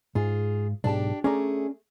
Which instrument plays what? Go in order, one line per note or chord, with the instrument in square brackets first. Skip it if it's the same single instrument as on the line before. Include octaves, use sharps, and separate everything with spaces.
[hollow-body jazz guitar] G#2 [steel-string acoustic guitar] F4 G#4
[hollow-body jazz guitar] B1 G#2 A5 [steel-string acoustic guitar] D4 G4
[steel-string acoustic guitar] A3 G#4 [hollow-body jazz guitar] C#4 D5 A#5